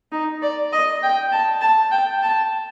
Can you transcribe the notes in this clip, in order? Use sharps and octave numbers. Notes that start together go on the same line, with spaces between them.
D#4
D5
D#5
G5
A5
A5
G5
A5